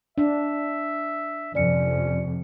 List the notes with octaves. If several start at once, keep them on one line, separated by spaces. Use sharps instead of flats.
D4 E5
F2 C3 C#4 D5 C#7